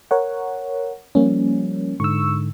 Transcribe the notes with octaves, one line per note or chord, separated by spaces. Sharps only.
A#4 C#5 F#5
F3 G3 A#3 C#4
G#2 D3 C#6 E6